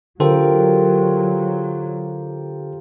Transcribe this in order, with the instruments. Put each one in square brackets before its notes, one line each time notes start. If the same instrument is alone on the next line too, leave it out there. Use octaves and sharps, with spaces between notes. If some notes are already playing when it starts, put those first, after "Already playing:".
[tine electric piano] D3 A4 C5 [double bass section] F#3 [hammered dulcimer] F4 G4 A#4